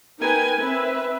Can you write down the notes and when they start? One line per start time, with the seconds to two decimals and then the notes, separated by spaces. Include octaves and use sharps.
0.19 D#4 A#4 B4 G5 G#5
0.58 C4 B4 E5